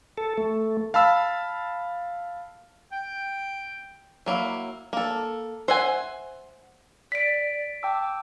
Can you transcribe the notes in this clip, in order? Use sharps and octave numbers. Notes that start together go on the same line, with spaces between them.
A4
A3
F5 A5 B5 E6
G5
F#3 A#3 E4
A#3 A4
C5 E5 F#5 G#5
D5 B6 D7
G5 A5 D6 E6